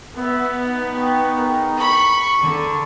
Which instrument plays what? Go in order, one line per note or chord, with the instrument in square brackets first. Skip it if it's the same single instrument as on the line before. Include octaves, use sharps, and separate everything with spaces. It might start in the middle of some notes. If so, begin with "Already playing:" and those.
[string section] B3 [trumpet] E5 [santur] F#5 B5
[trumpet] D#4
[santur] G4 C#6
G#4 A#4 G5
[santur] E4 [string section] B5 [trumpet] C#6
[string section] D3